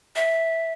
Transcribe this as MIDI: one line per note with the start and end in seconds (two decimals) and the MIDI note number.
0.16 0.73 76